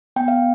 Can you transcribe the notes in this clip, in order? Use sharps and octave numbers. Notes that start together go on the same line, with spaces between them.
B3 G5
F5